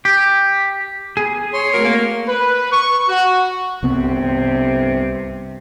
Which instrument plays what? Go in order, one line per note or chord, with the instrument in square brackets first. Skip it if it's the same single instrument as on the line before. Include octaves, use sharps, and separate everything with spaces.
[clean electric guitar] G4
[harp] B3 [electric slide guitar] G#4
[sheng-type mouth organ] C#5 C6
[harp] A3 C4 F#4 [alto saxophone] A#4
[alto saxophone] A#3
[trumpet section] B4
C#6
F#4
[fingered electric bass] C2 B3 C4 [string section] G2 C3